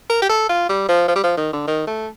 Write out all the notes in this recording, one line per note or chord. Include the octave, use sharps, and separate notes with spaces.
A#4
G4
A4
F4
G3
F3
F3
G3
F3
D#3
D3
D#3
A3